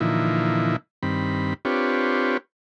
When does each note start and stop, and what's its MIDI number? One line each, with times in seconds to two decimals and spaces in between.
0.01 0.76 46
0.01 0.76 50
0.01 0.76 52
0.01 0.76 53
0.01 0.76 63
0.01 0.76 64
1.03 1.54 43
1.03 1.54 51
1.03 1.54 60
1.03 1.54 83
1.65 2.37 60
1.65 2.37 62
1.65 2.37 65
1.65 2.37 67
1.65 2.37 71
1.65 2.37 73